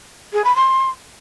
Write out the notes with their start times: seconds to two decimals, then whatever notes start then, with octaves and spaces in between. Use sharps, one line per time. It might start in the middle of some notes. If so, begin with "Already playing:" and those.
0.33 G#4
0.44 B5
0.56 C6